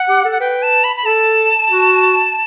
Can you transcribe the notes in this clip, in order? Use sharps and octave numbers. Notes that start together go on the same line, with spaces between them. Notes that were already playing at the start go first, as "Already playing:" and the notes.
Already playing: F#5
G4
A4
F#5
B4 G5
A5
B5
B5
A4 A5
F#4